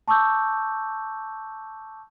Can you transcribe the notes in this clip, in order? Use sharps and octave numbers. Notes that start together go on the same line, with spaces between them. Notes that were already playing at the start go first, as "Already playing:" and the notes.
A5 C#6 D6 E6 G6